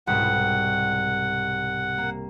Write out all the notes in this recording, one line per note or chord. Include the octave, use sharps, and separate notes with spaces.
C2 G#2 B2 F#5
A#3